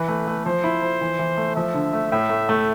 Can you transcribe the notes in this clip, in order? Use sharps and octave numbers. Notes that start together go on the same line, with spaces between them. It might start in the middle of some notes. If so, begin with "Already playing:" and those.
Already playing: E3 B4
A3
A3
F3 C5
E4
F3
E3
E3
A3
F3 E5
D3
A3
A2 E5
A3
A3